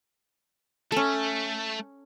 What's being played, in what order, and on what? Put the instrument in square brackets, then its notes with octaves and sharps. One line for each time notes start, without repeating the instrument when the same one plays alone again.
[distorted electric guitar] A3 [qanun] C#4 A4